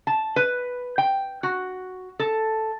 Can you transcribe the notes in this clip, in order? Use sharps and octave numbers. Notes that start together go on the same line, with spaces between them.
A5
B4
G5
F#4
A4